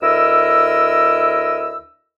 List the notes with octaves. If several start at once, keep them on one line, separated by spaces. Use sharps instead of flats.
D2 E4 A#4 D#5 E6